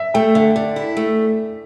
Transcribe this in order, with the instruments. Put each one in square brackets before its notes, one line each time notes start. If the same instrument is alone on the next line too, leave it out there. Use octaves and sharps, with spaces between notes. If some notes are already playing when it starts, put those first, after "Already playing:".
Already playing: [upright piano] E5
[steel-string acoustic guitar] A3 [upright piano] G5
[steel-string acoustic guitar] D3 [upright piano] E5
[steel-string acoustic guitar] D3 [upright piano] D5
[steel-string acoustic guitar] E4
A3